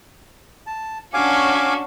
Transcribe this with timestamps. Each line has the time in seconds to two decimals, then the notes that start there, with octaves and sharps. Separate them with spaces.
0.67 A5
1.14 C#4 D4 F#4 F5 G#5 D6